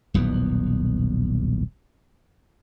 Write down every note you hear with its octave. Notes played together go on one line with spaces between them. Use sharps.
D#1 B1 E2 B3